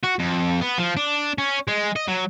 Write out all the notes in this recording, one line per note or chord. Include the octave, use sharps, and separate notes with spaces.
F#4
F2
B3
F3
D4
C#4
G#3
D#5
F#3